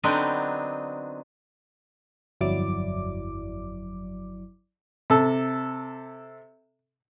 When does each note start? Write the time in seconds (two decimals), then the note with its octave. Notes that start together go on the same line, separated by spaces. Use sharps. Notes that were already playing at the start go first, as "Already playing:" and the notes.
0.04 D3 F#3 B3 C4 D4 D#4
2.41 G1 F2 F#3 E4 D5 D6
5.10 C3 A4